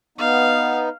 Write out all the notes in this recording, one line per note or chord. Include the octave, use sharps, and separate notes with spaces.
B3 D#4 F5